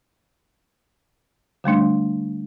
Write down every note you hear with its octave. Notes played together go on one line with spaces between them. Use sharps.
D3 G3 A3 D4